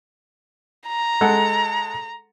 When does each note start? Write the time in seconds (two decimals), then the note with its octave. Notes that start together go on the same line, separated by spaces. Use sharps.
0.89 A#5
1.21 G#3 A4 F#5